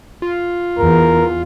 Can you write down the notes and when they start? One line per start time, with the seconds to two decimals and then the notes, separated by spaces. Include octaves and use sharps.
0.22 F4
0.79 E2 A#4